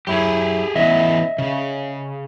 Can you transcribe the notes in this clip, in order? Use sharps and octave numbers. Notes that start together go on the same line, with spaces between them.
F#2 E4 G4 G#4
E3 B3 C#4 D#5 E5
C#3